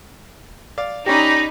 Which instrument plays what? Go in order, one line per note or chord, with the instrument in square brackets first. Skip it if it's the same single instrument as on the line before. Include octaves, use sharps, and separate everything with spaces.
[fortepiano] D5 F5
[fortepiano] C#4 G4 [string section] D#4 [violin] D5 B5 [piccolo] A#6